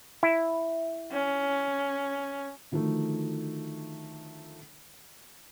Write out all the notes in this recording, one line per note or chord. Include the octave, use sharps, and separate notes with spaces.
E4
C#4
D3 D#3 F3 F#3 A3